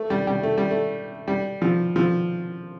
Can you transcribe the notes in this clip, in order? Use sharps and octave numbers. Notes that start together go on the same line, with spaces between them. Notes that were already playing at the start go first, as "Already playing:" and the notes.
Already playing: A3
G3
G3
A3
G3
A3
G3
F3
F3